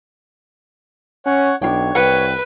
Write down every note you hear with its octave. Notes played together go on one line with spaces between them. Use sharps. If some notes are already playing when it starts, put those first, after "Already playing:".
C#4 C#5 F#5
B1 D4 F4 C#5 G5
C2 B4 F#5 G5